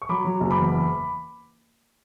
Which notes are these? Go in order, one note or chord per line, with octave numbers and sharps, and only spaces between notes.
C#6
F#3 B5 D6
F#3
F#1
B5 D6
E2
E2